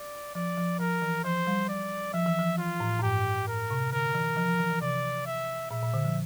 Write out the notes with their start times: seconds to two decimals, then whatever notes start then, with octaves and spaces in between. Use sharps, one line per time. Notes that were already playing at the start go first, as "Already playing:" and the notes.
Already playing: D5
0.35 F3 D5
0.57 F3
0.80 F3 A#4
1.02 E3
1.24 F3 C5
1.47 G3
1.69 D5
2.14 F3 E5
2.26 E3
2.39 F3
2.58 E3 F4
2.80 A2
2.99 A2
3.03 G2 G4
3.48 A2 A#4
3.71 C3
3.92 D3 A#4
4.15 E3
4.37 F3
4.48 F3
4.59 E3
4.70 E3
4.82 C3 D5
5.26 E5
5.71 A#2 E5
5.82 A#2
5.94 D3
6.05 F3